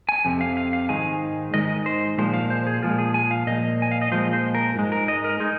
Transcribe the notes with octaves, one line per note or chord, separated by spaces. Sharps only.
G#5
F2 C3
F5
F5
F5
G#2 D#3 G#3 G#5
G#2 D#3 G#3 D#5
C5
A#2 F3 G#3 C5
F5
C5
G#4
A#2 F3 G#3 F4
G#4
G#5
F5
A#2 F3 D#5
G#5
F5
D#5
A#2 F3 G#3 C5
C5
A#4
G#2 G#3
A#4
D#5
A#4
G#3 D#4